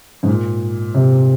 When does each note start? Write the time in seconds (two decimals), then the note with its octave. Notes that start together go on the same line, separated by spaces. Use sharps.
0.23 G#2
0.28 A#2
0.94 C3